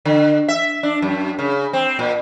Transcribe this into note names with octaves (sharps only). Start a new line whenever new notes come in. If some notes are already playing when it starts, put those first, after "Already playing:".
D3
E5
D4
F#2
C#3
C4
A#2